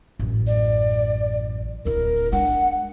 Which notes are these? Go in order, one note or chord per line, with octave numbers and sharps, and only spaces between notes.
A1 F#2
D5
D1 E4 A#4
G#3 D4 F#5